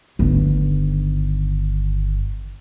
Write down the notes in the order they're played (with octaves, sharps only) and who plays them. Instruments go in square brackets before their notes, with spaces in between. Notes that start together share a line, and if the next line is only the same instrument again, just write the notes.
[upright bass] G1 D#3